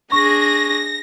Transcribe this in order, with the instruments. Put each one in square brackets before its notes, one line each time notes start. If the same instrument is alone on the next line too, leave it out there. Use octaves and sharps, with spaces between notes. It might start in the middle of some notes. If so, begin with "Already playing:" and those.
[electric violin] D4 G#4 [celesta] C#6 [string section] A#6